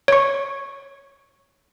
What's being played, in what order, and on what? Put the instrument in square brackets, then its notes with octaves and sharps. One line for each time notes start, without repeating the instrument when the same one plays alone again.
[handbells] C#5 C#6